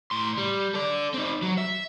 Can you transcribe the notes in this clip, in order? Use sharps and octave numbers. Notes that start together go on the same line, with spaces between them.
A2 C6
G3
A4 D5
C4 D#4
F#3
E5